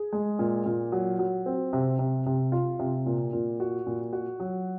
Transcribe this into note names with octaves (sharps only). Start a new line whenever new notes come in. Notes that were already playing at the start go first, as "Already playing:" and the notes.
Already playing: G#4
G#3
A#2
A#2
F#3
F#3
C4
C3
C3
C3
F4
C3
A#2
A#2
F#4
A#2
F#4
F#3